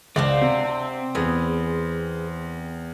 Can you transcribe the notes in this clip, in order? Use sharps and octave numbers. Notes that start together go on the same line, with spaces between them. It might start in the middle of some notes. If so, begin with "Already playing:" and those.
C#2 C4 D4 F5 F#5
C3
E2 B3 G#4